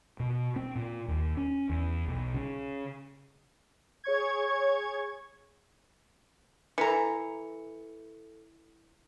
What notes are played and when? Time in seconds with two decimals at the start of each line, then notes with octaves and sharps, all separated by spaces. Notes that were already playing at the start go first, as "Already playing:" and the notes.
0.20 B2
0.56 C4
0.75 A#2
1.08 D#2
1.37 C#4
1.70 E2
2.08 B1
2.34 C#3
4.04 G#4 C#5 C#6 G#6
6.78 E3 A4 A#5 C#7